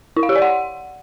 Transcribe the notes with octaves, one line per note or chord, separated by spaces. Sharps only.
E4
F5
G4
D5
F#5